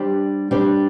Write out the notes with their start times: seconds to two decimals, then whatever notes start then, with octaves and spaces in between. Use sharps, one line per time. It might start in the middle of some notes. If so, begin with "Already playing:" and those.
Already playing: G3 D4 G4 C5
0.51 G3 D4 G4 C5